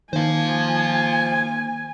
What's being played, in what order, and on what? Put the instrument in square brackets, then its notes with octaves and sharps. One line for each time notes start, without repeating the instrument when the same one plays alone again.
[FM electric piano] D#3 [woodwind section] A#3 [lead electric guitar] C5 F5 [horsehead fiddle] G#5